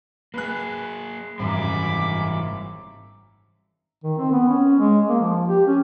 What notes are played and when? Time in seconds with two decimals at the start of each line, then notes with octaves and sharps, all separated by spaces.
0.34 A#3 G#4 B4 F#6
1.39 G#1 F#2 E3 G3 G#5 B5 D6
4.04 D#3
4.18 C4
4.32 B3
4.48 C#4
4.80 G#3
5.09 A#3
5.20 F3
5.48 G4
5.67 C#4